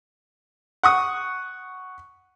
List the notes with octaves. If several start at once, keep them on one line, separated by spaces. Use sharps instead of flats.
F#5 C#6 D#6